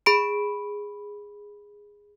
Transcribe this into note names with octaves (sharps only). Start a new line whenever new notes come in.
G#4 B5 D7